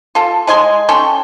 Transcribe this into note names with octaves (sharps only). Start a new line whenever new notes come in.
F4 A4
G#3 D#5 G#5 C6
C#4 A4 G5 C6